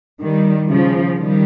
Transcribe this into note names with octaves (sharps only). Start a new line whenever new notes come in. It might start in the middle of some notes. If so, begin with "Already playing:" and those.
D#3 G3
C#3 F3
D#3 G3